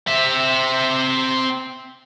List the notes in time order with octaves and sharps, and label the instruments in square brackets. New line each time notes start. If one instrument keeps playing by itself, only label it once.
[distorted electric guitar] C4 E5